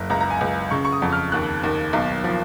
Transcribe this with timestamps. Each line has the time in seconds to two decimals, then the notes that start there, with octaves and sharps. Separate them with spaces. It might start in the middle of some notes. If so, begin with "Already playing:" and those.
Already playing: F#1
0.10 C#2 A#5
0.21 A#5
0.30 G#5
0.41 C#2
0.71 C#3 C#6
0.85 C#6
0.92 D#6
1.02 F2
1.13 F6
1.32 D#2 F#6
1.63 D#2
1.93 B1
2.24 F3